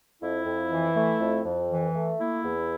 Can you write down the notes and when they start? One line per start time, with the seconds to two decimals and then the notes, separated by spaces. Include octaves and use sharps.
0.21 F2 E4
0.45 F2
0.71 E3
0.95 A3
1.19 F2
1.44 F2
1.69 E3
1.94 A3
2.19 A#3 E4
2.44 E2